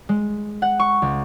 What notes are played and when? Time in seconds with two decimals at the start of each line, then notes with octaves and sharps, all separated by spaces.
0.09 G#3
0.62 F#5
0.80 C#6
1.02 C#2